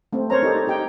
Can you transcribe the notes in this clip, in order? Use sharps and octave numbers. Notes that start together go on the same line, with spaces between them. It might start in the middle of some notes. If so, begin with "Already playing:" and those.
A3 C4
A#4 C5 C#5 A#5
D#4 G4 A4 D5
D#4 G4 G5